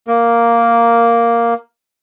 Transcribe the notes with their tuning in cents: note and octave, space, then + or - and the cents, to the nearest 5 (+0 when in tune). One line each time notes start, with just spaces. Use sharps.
A#3 +0 A#4 +0